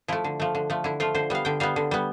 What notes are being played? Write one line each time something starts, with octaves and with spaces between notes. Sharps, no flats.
F3 A3 E4
D3
F3 A3
D3
F3 A3
D3 E4
F3 A3 F4
D3 C5
G3 B3 F5
D3 G5
G3 B3 F5
D3
G3 B3